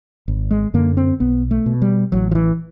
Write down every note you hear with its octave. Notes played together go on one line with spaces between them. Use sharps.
G#1
G#3
F#2 D3 A#3
C4
B1 B3
A3
B2
G3
A1 F#3
F3
E3